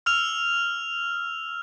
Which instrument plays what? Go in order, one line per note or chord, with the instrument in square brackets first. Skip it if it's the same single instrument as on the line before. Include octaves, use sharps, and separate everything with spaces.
[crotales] E6 F6 F7